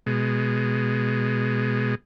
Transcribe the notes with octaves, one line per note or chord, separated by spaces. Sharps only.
B2 G#3